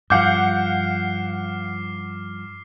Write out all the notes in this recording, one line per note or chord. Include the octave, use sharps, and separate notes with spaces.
G2 F3 F5 F#5 D6 F6 G6 C7